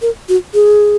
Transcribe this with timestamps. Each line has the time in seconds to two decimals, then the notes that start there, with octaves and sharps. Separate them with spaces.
0.02 A#4
0.29 F#4
0.54 G#4